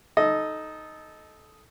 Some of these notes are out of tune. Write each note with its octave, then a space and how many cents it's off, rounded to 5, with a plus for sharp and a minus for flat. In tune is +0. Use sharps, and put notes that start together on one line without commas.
D#4 +0 A4 -15 D#5 +0